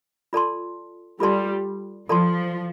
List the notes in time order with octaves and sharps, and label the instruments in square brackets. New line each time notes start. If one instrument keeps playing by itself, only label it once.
[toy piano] F4 A4 D5 A5 C6
[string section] G3 [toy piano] F4 A4 D5 A5 C6
[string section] F3 [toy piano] F4 A4 D5 A5 C6